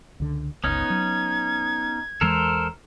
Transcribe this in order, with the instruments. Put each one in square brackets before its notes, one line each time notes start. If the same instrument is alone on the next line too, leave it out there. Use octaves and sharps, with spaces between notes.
[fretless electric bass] C#2 D3
[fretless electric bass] G1 C#2 [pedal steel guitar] B3 C#4 D#4 [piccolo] G#6
[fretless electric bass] F#3
[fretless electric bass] E2 E3 G#3 [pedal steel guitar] A4 A#4 C5